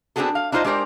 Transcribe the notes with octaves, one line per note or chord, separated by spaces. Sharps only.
B3 C4 D4 F#4 G#4 A4
F5
D4 D#4 F4 B4 C5 D#5
G#3 D4 G4 A#4 C5 D5